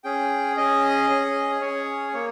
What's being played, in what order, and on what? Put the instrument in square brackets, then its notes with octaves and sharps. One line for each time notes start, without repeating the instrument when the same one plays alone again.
[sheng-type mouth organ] C#4 G#4 G5
C#4 G#4 D#5
C#4 G#4
C#4 G#4 C#5
A#3 C#5